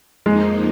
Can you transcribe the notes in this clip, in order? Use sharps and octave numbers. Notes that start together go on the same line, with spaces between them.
F2 F3 G#3 A#3 D#4